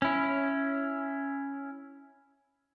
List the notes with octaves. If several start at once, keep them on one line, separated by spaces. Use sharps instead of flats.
C#4 E4